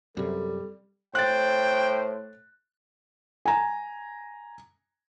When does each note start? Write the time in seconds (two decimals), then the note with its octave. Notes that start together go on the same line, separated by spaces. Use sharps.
0.17 F#2 C3 G3 A4
1.15 A2 C5 G5 F#6 A6
3.45 G#5 A#5